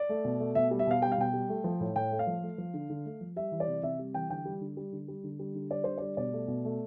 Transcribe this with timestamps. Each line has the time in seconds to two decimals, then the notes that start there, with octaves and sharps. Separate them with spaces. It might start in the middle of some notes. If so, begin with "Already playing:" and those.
Already playing: D5
0.09 A3
0.25 B2
0.40 A3
0.55 B2 E5
0.71 G3
0.79 E5
0.87 B2 F5
1.02 G3 G5
1.12 F5
1.18 B2 G5
1.33 G3
1.49 A3
1.64 F3
1.80 A2
1.96 A2 G5
2.12 A3
2.19 F5
2.27 F3
2.43 A3
2.58 F3
2.74 D3
2.90 D3
3.05 A3
3.21 F3
3.36 G3 E5
3.52 E3
3.60 D5
3.67 C3
3.83 C3 E5
3.99 G3
4.14 E3 G5
4.30 D3 G5
4.45 G3
4.61 D3
4.77 G3
4.93 D3
5.08 G3
5.24 D3
5.39 G3
5.55 D3
5.70 G3 D5
5.84 D3 C5
5.98 G3 D5
6.17 B2 D5
6.33 A3
6.48 B2
6.65 A3